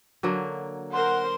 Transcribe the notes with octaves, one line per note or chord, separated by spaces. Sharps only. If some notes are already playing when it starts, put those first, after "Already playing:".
D3 F#3 A#3
A#4 C5 F#5 C6